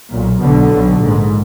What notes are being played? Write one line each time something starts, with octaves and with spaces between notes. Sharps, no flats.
B1 A#2
B1 B2 D3
B1 B2
A#1 G#2